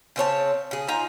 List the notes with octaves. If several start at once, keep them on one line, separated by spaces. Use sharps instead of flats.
C#3 C4 C#5 A5
C#3 G#4
D#4 F4 G#5 A#5